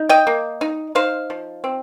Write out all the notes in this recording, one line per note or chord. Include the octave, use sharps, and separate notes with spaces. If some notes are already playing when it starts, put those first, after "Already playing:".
Already playing: D#4
D#5 G5
A#3
D#4
D#4 C5 F5
F3
C4